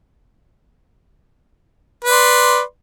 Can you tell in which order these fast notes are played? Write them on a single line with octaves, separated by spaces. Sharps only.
B4 D5 C6